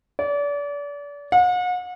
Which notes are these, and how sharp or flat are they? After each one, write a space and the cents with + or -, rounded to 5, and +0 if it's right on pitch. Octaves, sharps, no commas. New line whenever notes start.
D5 -35
F#5 -40